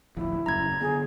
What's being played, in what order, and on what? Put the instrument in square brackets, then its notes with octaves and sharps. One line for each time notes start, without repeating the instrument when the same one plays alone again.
[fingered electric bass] D1 G1 F3 [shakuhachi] E4
[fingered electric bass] D#1 F#2 C#3 [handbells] A#5 G#6
[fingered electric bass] D3 B3 [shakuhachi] G#4